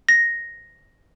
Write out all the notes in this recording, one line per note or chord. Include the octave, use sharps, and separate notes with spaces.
A#6